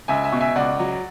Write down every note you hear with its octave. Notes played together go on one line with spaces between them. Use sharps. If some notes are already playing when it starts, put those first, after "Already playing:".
C#2 E5 G#5
E5 G#5
B2
E5 G#5
C#2 D5 F#5
F#3